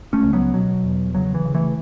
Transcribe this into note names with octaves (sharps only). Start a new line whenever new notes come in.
A3 C#4
C#2
F#3 B3
B2 F#3
E2
C#3 F#3
E3
C#3
E3 A3